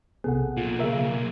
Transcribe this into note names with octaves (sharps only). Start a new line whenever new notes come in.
B1 C3 B3 G#4 A4 F#5
B1 A#2 F4
C#3 A#4 E5